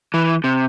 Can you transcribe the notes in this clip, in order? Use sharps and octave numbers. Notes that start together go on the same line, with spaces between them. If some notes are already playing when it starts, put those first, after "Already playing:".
E3
C3